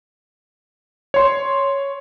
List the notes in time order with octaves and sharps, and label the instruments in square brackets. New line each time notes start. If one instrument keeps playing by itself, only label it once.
[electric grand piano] C#5 C6